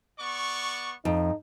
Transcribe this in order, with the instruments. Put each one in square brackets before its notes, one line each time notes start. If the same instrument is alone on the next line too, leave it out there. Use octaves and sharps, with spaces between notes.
[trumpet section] B3 D5 C#6
[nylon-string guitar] F2 [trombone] D#4